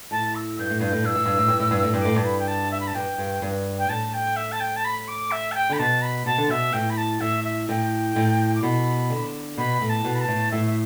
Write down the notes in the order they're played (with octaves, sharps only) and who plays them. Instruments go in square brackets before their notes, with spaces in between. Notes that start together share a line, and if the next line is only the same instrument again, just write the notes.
[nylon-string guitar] A2 [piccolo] A5
[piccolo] E6
[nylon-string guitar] G2 [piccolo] G6
[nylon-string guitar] A2
[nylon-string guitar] G2 [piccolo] G6
[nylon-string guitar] A2
[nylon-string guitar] G2 [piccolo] E6
[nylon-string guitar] A2
G2
A2
G2
A2
G2
A2
G2
[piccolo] D6
[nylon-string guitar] A2
[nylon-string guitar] G2 [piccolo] A5
[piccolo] B5
G5
A5
E5
B5
A5
[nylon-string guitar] G2 [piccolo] G5
[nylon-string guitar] G2
G2
[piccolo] G5
[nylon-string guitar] A2 [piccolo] A5
[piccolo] G5
E5
A5
G5
A5
B5
D6
E5
A5
G5
[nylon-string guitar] D3 [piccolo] B5
[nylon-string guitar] B2 [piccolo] A5
[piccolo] B5
[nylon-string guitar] B2 [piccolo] A5
[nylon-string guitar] D3
[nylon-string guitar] B2 [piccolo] E5
[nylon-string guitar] A2 [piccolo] G5
[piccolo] B5
A5
[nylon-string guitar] A2 [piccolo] E5
[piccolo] E5
[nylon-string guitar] A2 [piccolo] G5
[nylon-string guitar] A2
[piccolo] D6
[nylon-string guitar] B2 [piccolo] B5
[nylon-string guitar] D3
[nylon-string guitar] B2 [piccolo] B5
[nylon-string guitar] A2
[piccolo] A5
[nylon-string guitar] B2
[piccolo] B5
A5
[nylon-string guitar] A2
[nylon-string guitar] A2 [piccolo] E5
[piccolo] E5